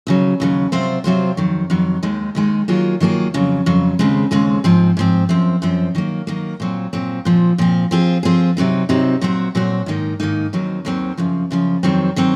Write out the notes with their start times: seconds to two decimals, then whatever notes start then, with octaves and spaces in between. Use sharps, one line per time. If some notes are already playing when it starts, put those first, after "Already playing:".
0.07 D#2 C#3 F#3
0.40 D#2 C#3 F#3
0.72 C3 F#3 C4 F4 C5
1.04 C3 F#3 C4 F4 C5
1.37 F2 D#3 F#3
1.70 F2 D#3 F#3
2.03 D#2 D#3 G#3 D#4
2.35 D#2 D#3 G#3 D#4
2.68 D#3 F#3 A#3 F4 G#4
3.00 D#3 F#3 A#3 F4 G#4
3.34 F2 C#3 F#3
3.66 F2 C#3 F#3
3.99 D#2 C#3 G#3 C4
4.31 D#2 C#3 G#3 C4
4.64 G#2 F3 C4
4.97 G#2 F3 C4
5.29 F#2 F3 C4
5.62 F#2 F3 C4
5.95 D#3 F#3 A#3
6.27 D#3 F#3 A#3
6.60 A#2 F#3 C4
6.93 A#2 F#3 C4
7.25 A#2 F3 C4
7.58 A#2 F3 C4
7.91 F3 C4 F4 G#4
8.23 F3 C4 F4 G#4
8.57 C3 F#3 C4 D#4
8.89 C3 F#3 C4 D#4
9.21 A#2 F#3 C4 F#4
9.55 A#2 F#3 C4 F#4
9.86 G#2 D#3 A#3 D#4
10.20 G#2 D#3 A#3 D#4
10.53 D#2 D#3 F#3 C4
10.85 D#2 D#3 F#3 C4
11.17 F#2 C#3 F3
11.51 F#2 C#3 F3
11.83 F2 D#3 F#3 C4
12.16 D#3 F#3 C4